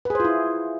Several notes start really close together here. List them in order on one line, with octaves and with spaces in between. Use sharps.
B4 G#4 C5 F4 E4